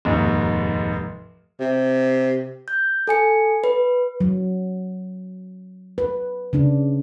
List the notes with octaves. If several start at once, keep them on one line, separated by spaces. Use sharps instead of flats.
F1 D#2 G#2
C3
G6
A4 G#5 C#7
B4
F#3
B4
C#3 D4